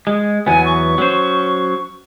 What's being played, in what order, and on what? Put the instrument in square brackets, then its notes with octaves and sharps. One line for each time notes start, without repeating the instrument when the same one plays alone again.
[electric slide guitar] G#3
[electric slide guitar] E2 F#3 B3 [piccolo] G#5
[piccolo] C#6
[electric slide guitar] F#3 C#4 C5